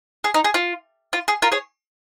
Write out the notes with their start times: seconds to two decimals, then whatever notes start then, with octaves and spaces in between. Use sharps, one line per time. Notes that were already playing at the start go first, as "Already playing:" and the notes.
0.24 G#4
0.34 D#4
0.44 G#4
0.54 F4
1.13 F4
1.28 G#4
1.42 F4 A#4
1.52 G#4 C#5